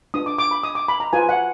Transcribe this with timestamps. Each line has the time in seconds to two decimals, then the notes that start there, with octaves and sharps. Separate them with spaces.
0.14 D4 F4 B4 D#6
0.26 D6
0.38 D6
0.51 B5
0.63 D#6
0.75 D6
0.88 B5
1.00 A#5
1.13 F4 B4 G#5
1.29 F#5